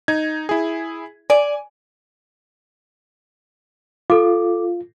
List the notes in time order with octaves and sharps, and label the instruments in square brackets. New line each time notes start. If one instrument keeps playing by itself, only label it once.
[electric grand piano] D#4 G#6
E4 G#4
[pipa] D5 [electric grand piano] G#5
[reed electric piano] F4 [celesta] A4 D6